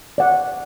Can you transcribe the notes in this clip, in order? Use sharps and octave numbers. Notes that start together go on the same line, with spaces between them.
D5 F#5